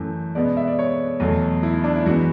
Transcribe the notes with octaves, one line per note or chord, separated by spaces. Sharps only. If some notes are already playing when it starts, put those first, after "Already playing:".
Already playing: F#2 E3 A3
B2 G#3 B3 D5
E5
D5
C#5
E2 B2 F#3 A3
E4
E4
D4
E4
F#2 E3 G#3 B3 F#4